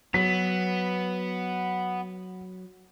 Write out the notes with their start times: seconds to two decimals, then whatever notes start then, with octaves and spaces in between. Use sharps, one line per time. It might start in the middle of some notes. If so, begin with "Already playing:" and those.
0.14 F#3 B3 B6